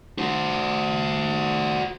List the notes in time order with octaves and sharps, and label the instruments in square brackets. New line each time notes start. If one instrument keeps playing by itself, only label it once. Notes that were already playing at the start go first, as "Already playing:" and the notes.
[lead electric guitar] F#4 C5